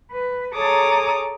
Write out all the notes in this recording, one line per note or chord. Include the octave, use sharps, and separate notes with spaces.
B4
G#4 A4 C#5 A#5 D6 D#6